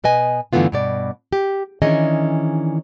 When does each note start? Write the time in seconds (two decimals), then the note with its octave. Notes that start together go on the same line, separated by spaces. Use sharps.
0.04 B2 B4 D#5 G#5
0.53 G2 D3 E3 A3 B3 F4
0.72 G2 B2 D5
1.33 G4
1.82 D#3 E3 C#4 D4 G#4 D#5